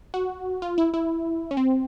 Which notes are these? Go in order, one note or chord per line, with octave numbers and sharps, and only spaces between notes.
F#4
F4
E4
E4
C#4
C4